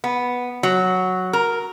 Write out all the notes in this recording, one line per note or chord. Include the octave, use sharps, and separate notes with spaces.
B3
F#3
A#4